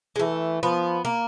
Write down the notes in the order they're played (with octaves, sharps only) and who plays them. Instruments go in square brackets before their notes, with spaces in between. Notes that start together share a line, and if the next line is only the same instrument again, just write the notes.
[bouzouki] G#3
[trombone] E3 [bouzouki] A3
[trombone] F3 [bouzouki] B3
[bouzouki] A#3